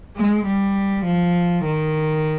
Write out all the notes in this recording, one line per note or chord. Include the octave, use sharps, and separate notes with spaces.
G#3
G3
F3
D#3